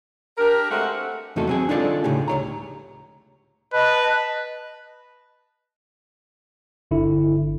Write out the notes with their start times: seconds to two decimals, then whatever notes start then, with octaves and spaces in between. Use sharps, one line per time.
0.38 D4 G4 A#4
0.70 G#3 A3 C4 F#4
1.36 E2 C3 A3 D#4 F#4 A4
1.47 F#3 C4 G#4
1.69 D4 D#4 F4 A4 C5 D5
2.04 A2 C#3 D#4 G4 G#4
2.28 C#2 C#5 A#5
3.73 B4 D#5 A5 F#6
6.91 G1 D3 E4